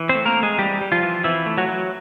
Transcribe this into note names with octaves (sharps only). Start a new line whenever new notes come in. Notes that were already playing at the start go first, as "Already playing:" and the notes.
Already playing: E3
C4 C5
A3
A#3 A#4
C4
G#3 G#4
E3 G3 G4
G3
F3 F4
E3
E3 C4 E4
A3
F#3 F#4
F#3